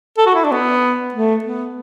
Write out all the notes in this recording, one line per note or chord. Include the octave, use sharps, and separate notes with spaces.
A4
F#4
E4
D4
B3
A3
B3